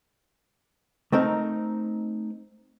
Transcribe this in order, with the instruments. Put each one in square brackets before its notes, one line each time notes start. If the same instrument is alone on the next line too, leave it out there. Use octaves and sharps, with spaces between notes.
[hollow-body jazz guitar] A3 C4 D#4 A#4